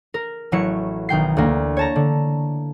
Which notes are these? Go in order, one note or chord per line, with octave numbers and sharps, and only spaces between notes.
A#4
A1 F#3 E4 C#7
B1 D#3 G5 C7
D2 A#3
C#5 A5 A#5
D3